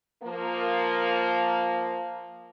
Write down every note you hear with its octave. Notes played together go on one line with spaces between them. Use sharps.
F3 A#3